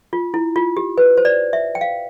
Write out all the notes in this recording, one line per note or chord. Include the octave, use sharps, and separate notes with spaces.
F4
E4
F4
G4
B4
C5
D5
E5
G5
F5